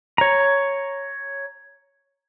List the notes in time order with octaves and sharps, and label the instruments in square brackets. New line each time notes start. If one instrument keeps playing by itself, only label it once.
[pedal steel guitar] C#5 A#5